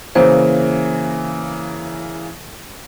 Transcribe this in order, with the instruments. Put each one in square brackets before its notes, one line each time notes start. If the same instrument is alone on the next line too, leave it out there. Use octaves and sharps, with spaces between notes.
[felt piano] C#3 E3 A#3 [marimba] C5